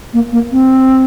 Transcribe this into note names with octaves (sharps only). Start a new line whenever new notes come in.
A#3
A#3
C4